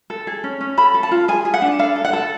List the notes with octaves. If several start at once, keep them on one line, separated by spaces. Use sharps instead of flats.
A4
G#4
C#4
C#4
A4 B5
A4
A5
F4
G#4 G#5
G#4
F#5
D4
A4 F5
A4
F#5
A4